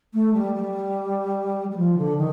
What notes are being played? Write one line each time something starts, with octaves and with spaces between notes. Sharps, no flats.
A3
G3
G3
G3
F3
D3
D#3